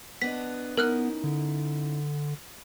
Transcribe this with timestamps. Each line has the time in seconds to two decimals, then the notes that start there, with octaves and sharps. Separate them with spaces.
0.22 B3 D4 D#5 B6
0.77 B3 C#4 D#4 E4 A#4 F6 F#6
1.24 D3